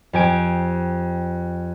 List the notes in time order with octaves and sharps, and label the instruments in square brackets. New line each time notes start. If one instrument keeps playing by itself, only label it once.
[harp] F2 G4 G#5 D7